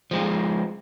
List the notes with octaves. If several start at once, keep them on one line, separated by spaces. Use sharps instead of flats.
F3 G#3 C4